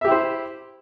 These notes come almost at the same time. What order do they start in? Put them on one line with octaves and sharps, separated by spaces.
E5 G4 E4 C5